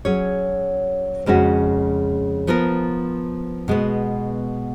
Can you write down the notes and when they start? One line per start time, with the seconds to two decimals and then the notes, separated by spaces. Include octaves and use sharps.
0.05 F#3 C#4 G#4 C#5
1.26 F2 C#3 G#3 C#4 F#4
2.47 F3 B3 F4 A#4
3.68 B2 G#3 B3